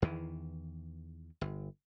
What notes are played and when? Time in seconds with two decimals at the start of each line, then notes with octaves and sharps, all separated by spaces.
0.02 E2 D#3 E3
1.41 G1